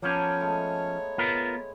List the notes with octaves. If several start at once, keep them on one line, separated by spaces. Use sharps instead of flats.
F3 A#3 B3 C#4 A4 C#5
G#3 A3
B3 F4 A#4